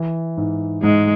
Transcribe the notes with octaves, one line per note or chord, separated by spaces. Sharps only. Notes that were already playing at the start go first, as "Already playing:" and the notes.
Already playing: E3
G#2
G#2 G#3